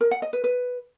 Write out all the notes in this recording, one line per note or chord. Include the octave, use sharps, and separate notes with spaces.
A#4
F#5
D#5
B4
B4